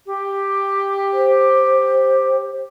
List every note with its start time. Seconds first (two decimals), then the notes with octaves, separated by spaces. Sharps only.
0.06 G4
1.13 C5